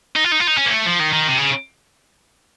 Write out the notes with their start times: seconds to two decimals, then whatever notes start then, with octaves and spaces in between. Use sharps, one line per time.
0.16 D#4
0.24 F4
0.32 D#4
0.40 F4
0.48 D#4
0.58 C#4
0.66 A#3
0.71 A3
0.86 F3
1.00 D#3
1.13 D#3
1.27 C3
1.38 C#3